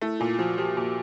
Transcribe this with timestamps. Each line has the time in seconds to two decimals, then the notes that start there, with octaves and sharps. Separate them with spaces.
0.01 A3 E4
0.20 A#2 F4
0.31 F4
0.39 F3 F#4
0.58 F3 G4
0.76 A#2 F#4